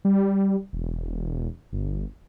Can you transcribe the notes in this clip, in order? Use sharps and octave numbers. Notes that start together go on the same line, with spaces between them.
G3
E1
G1